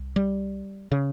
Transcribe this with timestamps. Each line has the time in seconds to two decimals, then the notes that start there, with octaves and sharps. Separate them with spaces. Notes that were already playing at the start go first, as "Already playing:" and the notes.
Already playing: C2
0.16 G3
0.92 C#3